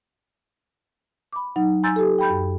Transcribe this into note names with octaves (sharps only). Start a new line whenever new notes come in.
B5 D6
F#3 D#4 F#5
G#5 A#5 C6 E6 G6 A6
G4 A4
G5 B5 G6
F#2